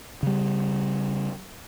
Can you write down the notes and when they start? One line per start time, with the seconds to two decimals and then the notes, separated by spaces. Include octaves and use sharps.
0.23 C#3 G3